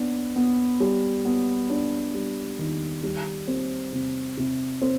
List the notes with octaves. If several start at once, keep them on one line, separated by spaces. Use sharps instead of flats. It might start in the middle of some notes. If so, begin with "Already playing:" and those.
Already playing: B3 D4
B3
G3
B3
D4
G3
D#3
G3
C4
C3
C3
C4